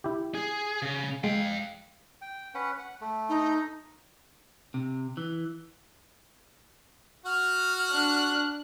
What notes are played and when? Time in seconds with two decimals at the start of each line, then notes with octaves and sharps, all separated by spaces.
0.04 E4 G4
0.35 G#4
0.82 C#3
1.24 G#3 F5 G5
2.21 G5
2.54 C#4 B4 F#5
2.79 F#5
3.01 A3
3.29 D#4
4.74 C3
5.17 E3
7.26 F#4 F#5 F6
7.90 D4 F#6